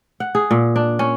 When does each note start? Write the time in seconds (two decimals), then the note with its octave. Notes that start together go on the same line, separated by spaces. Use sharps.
0.20 F#5
0.35 G#4
0.51 A#2
0.76 D4
0.99 C#4